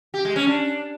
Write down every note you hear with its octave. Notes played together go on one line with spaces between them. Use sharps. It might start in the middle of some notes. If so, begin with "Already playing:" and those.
G4
G#3
C#4
D4